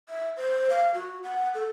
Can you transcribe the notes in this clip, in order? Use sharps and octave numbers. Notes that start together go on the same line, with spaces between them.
E5
C5
F5
F#4
F#5
A4